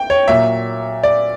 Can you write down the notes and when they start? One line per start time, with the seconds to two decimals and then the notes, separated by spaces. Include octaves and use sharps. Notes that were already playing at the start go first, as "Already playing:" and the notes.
Already playing: G5
0.10 C#5
0.28 A#2 F#3 E5
1.03 D5